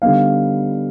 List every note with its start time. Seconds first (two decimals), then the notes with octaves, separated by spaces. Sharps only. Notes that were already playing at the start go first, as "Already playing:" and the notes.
0.02 D3 G3 B3 D#4 F5